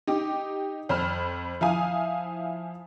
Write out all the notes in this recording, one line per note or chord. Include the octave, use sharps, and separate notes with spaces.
D#4 G4 D6
F2 C5 B5 F6
F3 E4 F5 G#5 D#6